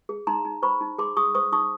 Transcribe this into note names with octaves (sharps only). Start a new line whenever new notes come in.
G#4
D#4 A#5 C6
D#4
C5 B5 C#6
D#4
G#4 C6 D6
G#4 C#6 D#6
C5 C#6 D#6
D#4 C#6 D#6